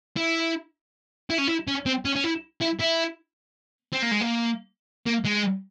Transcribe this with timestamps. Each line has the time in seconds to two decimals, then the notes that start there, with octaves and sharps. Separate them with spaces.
0.17 E4
1.30 E4
1.38 C#4
1.48 E4
1.68 C#4
1.86 C4
2.05 C#4
2.16 C#4
2.24 E4
2.62 E4
2.80 E4
3.93 C4
4.03 A#3
4.12 G#3
4.21 A#3
5.06 A#3
5.25 G#3